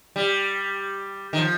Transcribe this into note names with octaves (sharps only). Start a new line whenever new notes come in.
G3
D#3
F3